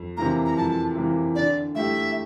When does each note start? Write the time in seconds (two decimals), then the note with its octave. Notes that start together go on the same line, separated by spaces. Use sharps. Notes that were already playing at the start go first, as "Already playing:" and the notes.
Already playing: F2
0.17 C3 E3 A#3 A#5
0.46 A#5
0.57 F2 A5
0.96 C3 E3 A#3
1.35 D3 D5
1.75 A3 E4 G4 E5